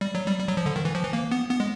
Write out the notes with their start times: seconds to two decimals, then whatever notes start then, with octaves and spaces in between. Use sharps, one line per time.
0.01 G3
0.15 F#3
0.27 G3
0.39 G3
0.48 F#3
0.57 F3
0.66 D3
0.76 D#3
0.85 E3
0.95 F3
1.04 E3
1.13 A#3
1.31 B3
1.50 B3
1.60 G#3